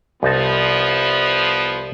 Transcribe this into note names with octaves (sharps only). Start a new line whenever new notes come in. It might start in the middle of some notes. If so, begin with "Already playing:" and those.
C2 F3 B3 D#4 A5